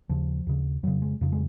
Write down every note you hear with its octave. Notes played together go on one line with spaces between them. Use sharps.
D#2 C#3 F3
D#2 C#3
F2 C#3 F#3
G#3
F2 C#3
G#3